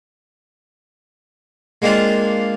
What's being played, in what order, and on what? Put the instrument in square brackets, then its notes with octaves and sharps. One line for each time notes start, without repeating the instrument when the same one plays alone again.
[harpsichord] G#3 A#3 C4 D4 F4